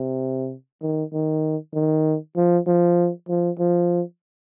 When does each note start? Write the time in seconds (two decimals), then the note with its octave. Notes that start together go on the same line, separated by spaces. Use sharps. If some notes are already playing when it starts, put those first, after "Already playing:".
Already playing: C3
0.82 D#3
1.13 D#3
1.74 D#3
2.37 F3
2.67 F3
3.29 F3
3.59 F3